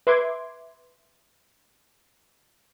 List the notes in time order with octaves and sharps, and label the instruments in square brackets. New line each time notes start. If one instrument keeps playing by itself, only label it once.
[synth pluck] B4 E5 C6 D6 G#6